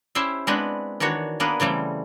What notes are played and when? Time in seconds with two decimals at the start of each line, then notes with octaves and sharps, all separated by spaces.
0.15 C#4 E4 G4 C5 E5
0.47 G#3 B3 C4 D4 B4
1.00 D#3 E3 D4 F#4 C#5
1.40 A#3 B3 D4 G#4 A#4 B4
1.60 C#3 E3 G3 A3 C4